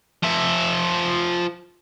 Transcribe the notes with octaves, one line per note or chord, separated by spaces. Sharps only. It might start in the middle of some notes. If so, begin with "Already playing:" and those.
F3 E5